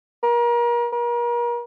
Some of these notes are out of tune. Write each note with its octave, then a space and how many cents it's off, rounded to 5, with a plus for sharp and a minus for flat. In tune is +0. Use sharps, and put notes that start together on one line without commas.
A#4 +35
A#4 +40